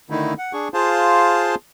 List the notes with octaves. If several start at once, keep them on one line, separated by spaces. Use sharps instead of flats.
D3 D#3 A3 D#4 E4
F#5
D4 G#4 C#6
F4 G#4 C5 F5 A5 C6